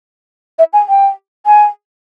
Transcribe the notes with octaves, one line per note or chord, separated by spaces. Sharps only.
E5
G#5
G5
G#5